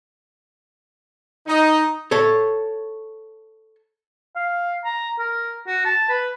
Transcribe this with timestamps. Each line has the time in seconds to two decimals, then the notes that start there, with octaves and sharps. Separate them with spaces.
1.48 D#4
2.11 A4 C#5
4.36 F5
4.85 A#5
5.19 A#4
5.67 F#4
5.85 A5
6.09 B4